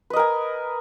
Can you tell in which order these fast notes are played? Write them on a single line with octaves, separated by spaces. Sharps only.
B4 D#5 A#4 G#5